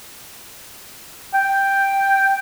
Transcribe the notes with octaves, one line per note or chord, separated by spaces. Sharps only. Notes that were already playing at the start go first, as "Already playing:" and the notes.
G5